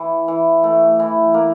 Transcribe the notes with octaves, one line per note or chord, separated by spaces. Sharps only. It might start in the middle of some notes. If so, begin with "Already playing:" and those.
Already playing: E3
E3
A3
E3
A#3